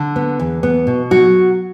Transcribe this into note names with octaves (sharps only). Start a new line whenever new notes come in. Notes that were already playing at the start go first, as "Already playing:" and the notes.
Already playing: D3
B3
E2
B3
B2
F#3 F#4